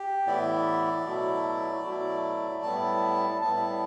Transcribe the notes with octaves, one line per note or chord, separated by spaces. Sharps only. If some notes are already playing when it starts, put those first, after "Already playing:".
Already playing: G4
A2 E3 B3 E4 D5
B2 F#3 A3 E4
B2 F#3 A3 E4
A2 G3 B3 E4 A5
A2 G3 B3 E4 A5